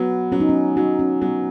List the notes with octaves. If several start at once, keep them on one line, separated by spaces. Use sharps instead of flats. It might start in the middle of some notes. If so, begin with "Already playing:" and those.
Already playing: F#3 B3
F#3 C#4
D#4
C#4
F#3 D#4
C#4
F#3 B3